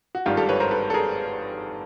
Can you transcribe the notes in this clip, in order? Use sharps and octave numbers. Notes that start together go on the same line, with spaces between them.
F#4
G#1 G2 D#3 F4 G4
G4 A4
B4 C#5
A#4 C5
A4 B4
A4
G#4 A#4